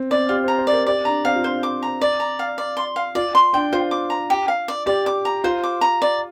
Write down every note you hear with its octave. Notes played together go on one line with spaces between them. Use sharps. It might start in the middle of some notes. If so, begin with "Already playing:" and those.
Already playing: C4
C4 D5
F4 G4
C5
A#5
C5
D5
A#4
G4 D5
D4 A#5
C4 F5
F4
D4 C5
D6
A#5
D5
A#5
F5
D5
C6
F5
F4 D5
C6
D4 G5
F4 C5
D6
A#5
G4
F5
D5
G4 D5
D6
A#5
F4 C5
D6
A#5
D5